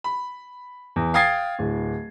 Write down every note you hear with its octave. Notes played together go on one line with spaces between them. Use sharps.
B5
E2
F5 G5 D#6 G#6 A6 C7
D1